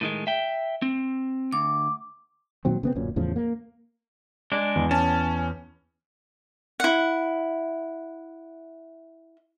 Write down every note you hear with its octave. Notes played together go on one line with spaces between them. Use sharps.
A2 D#3 G#3
E5 G5
C4
D2 D6
A#2 D#3 F#3 C4
C#3 B3 C4
D1 F#2 A#2 C#4
E2 A2 C#3 F3
A#3
G#3 D4 D5
E2
C#4 A5
E4 F#5